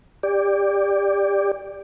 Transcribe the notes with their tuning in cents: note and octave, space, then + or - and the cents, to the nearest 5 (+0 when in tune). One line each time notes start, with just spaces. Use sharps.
G4 +25 D5 +0